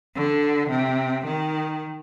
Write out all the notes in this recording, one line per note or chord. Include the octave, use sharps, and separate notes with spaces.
D3
C3
D#3